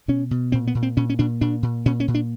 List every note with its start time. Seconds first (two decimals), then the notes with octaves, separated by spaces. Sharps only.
0.08 B2 C#4
0.31 B2
0.52 A#2 C4
0.67 B3
0.75 A#2
0.83 C4
0.97 A#2 C#4
1.10 C#4
1.19 A#2 D4
1.41 A#2 D4
1.63 A#2
1.86 A#2 C#4
2.00 C#4
2.08 A#2
2.15 D4